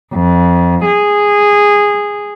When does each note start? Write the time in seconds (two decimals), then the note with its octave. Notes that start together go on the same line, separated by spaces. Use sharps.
0.14 F2
0.85 G#4